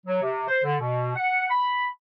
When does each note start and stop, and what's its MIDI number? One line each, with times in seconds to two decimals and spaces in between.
0.06 0.21 54
0.22 0.45 48
0.48 0.64 72
0.64 0.76 50
0.80 1.12 47
1.15 1.46 78
1.50 1.86 83